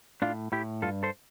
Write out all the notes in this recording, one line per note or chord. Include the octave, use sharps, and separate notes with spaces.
A2 D4 F4
A2 E4 G4
G2 F4 A4
A4 C5